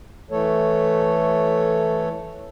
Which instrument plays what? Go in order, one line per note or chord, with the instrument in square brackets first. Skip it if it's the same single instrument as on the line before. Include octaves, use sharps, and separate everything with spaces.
[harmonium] E3 A3 A4 C#5